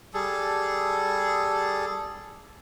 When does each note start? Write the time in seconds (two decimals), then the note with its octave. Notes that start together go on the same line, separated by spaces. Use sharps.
0.14 G3 G#4 A4